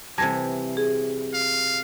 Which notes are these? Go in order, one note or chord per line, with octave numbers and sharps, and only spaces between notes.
C3 E3 G3 A5 G#6 A#6
G#4
F5